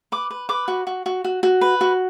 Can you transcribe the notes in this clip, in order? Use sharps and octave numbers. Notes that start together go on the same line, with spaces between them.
B4 D6
B4
B4 D6
F#4
F#4
F#4
F#4
F#4
B4
F#4